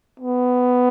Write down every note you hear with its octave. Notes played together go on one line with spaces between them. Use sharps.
B3